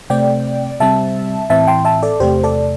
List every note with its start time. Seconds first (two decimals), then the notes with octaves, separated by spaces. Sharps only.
0.10 C3 A3 C4 D5 G5
0.80 C3 G3 C4 E5 A5
1.50 A2 E3 C4 E5 A5
1.67 G5 C6
1.85 E5 A5
2.03 A4 D5
2.20 E2 C3 A3 G4 C5
2.43 A4 D5